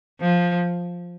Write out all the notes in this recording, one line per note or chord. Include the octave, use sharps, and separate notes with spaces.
F3